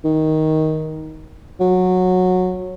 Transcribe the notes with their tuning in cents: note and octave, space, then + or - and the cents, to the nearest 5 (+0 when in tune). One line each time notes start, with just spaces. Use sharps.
D#3 +10
F#3 -15